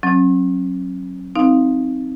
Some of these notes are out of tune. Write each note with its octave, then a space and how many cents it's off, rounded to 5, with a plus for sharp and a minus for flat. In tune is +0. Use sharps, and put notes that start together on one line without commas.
F#3 +0 C#4 -40
C4 +0 D#4 +10 F5 +0